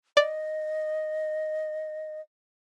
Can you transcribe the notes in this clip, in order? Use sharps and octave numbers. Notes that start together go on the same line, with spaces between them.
D5 D#5